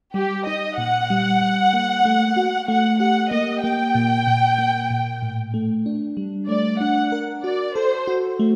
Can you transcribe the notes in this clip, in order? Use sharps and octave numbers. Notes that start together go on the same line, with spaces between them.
G3 G4
D#4 D#5
A#2 F#5
G3
G3
A#3
A3
F#4
A3 F#5
G4 F#5
A#3 D#5
A#3 G5
A#2
A#2
A#3
A#2
A2
A3
D4
G3
A3 D5
D4 F#5
A#4
F#4 D5
A4 C5
F#4
A3